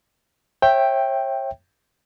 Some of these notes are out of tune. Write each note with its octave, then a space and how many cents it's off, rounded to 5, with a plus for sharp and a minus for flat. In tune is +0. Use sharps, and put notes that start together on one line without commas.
C#5 -40 E5 +0 G5 +0